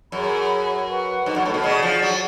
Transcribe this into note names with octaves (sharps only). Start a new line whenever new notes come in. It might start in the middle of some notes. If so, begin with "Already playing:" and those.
F#2 G#4 C#5 F#5 B5
B4 F#5 C#6
G#2
F#2
A2
B2
C#3 G#4 D5 F#5
F3
F#3